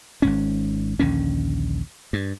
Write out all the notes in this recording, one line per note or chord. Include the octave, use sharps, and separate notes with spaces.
G#1 G#2 C#4
A#1 D#2 D3 C#4
G2